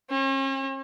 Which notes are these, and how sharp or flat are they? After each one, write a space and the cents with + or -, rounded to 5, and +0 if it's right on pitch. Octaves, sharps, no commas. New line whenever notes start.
C#4 -45